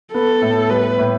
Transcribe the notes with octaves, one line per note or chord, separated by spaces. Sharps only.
B3 A4
A2
G3 B4
A2